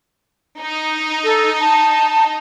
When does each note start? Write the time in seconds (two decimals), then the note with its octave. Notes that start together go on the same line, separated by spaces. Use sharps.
0.60 D#4
1.24 A4
1.60 A5